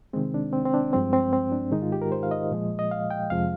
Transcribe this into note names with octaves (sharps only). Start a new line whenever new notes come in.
C3 D#3 G#3 C4
D4
C4
C4
D4
G2 F3 G#3 C4
C4
C4
D4
G#2 D#3 G#3 D#4
F4
G4
A#4
C5
F5
D#5
A#2 F3 G#3
D#5
F5
G5
F2 C3 F3 G#3 F5